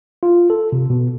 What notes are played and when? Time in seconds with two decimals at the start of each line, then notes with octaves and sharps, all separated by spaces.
0.23 F4
0.50 A4
0.72 C3
0.90 B2